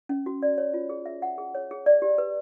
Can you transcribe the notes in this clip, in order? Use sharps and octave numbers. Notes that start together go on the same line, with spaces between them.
C#4
F#4
D5
C#5
F4
G#4
E5
F#5
G#4
C#5
G#4
D5
G4
B4